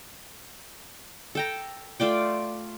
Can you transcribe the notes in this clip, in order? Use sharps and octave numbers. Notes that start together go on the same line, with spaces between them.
A4 G5 A#5
A3 F4 D5 G5